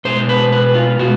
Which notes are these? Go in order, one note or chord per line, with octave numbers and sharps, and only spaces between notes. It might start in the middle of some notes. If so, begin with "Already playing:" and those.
B2 G#3 C5
B4
B4
F4
B2 G#3 F#4